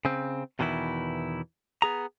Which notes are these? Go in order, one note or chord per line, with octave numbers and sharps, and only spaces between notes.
C#3 C4
E2 B2 D#3 E3 E4
B3 G#4 A#5